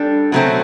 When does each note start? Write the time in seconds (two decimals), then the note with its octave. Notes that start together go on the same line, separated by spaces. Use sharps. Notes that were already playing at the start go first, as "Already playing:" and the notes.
Already playing: G3 D4 A4
0.32 B2 F#3 A3 C4